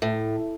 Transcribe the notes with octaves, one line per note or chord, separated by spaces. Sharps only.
A2